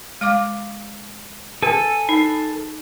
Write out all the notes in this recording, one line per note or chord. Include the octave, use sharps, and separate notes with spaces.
G#3 F5 D6
A4 B4 G#5
D#4